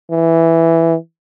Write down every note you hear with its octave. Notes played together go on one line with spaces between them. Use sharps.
E3